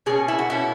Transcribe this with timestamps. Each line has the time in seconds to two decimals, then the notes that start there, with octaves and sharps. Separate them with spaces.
0.06 B2 A#3 C#4 G#4
0.28 E4
0.39 F#4
0.50 B2 A#3 C#4 E4